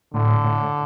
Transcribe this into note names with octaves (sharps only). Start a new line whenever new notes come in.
A2 D3
A2